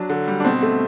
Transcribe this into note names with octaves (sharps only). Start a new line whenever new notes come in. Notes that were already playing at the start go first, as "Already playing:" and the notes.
Already playing: F#3 D4
D3
G3
D4
B2 C4
A3